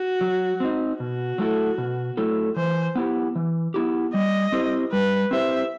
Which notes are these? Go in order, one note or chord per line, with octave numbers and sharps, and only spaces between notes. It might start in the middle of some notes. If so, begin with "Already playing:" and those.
Already playing: F#4
F#3
C4 D#4
B2 F#4
F#3 A3 E4 A4
B2
F#3 A3 E4 A4
E3 C5
B3 E4 G4
E3
B3 E4 G4
G3 D#5
C4 E4 G4 C5
G3 B4
C4 E4 G4 C5 E5